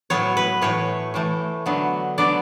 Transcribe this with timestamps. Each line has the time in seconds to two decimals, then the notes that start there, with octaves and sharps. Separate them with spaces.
0.10 A2 F#3 B3 C#5
0.37 B4
0.62 A2 E3 A3 C#5
1.14 A2 E3 A3
1.66 D3 F#3 B3
2.18 D3 F#3 B3 D5